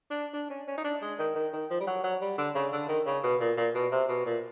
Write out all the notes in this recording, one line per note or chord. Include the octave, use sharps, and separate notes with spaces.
D4
D4
C#4
C#4
D#4
D4
G#3
D#3
D#3
D#3
F3
G3
F#3
F#3
G3
D3
C#3
D3
D#3
C#3
B2
A#2
A#2
B2
C3
B2
A#2